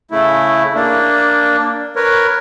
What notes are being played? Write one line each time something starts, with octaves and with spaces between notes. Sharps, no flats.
C#3 A3 E4
A#3 D4
A#4 B4 C#5